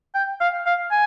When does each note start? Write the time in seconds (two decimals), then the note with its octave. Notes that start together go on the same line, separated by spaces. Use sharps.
0.14 G5
0.40 F5
0.66 F5
0.91 G#5